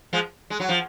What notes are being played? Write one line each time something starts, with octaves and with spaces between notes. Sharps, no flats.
F3 G#3
G#3
F#3
F3